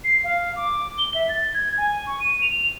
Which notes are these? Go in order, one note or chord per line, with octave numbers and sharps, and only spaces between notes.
C7
F5
D6
G7
E5
A6
G#6
G#5
C#6
D#7
F7